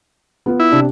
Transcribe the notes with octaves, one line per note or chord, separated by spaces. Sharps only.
B3 F4
E4
C3 D4